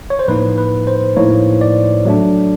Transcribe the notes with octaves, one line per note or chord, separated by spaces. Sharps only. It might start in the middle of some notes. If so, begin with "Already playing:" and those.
C#5
C5
A2 F3 A#3 D#4 B4
B4
C5
A2 F3 A#3 D#4 C#5
D5
F#3 A3 D4